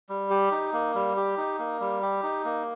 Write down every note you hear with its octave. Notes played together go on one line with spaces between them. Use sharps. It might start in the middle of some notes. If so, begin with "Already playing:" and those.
G3
G4
D#4
A#3
G3
G4
D#4
A#3
G3
G4
D#4
A#3